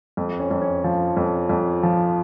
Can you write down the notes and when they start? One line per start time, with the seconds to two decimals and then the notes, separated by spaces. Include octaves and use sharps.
0.17 F2
0.39 C#4
0.51 F2
0.62 C#4
0.84 F3
1.17 F2
1.49 F2
1.83 F3